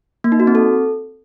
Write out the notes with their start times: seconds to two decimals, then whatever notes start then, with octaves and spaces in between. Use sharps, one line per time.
0.24 A#3
0.32 D#4
0.40 F#4
0.47 C4
0.55 A4